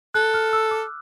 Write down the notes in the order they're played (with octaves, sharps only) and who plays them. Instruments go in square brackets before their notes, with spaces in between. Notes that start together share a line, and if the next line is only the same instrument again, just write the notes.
[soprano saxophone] A4 [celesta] F#6
[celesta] F6
E6
D6